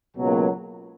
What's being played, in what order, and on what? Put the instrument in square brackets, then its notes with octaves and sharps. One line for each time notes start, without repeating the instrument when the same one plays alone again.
[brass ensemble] C#2 B2 F#3 A#3